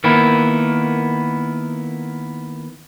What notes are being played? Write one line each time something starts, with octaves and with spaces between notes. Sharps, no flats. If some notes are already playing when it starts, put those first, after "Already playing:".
D#3 A#3 B3 E4